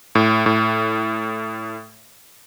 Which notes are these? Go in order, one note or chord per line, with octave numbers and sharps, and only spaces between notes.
A2
A2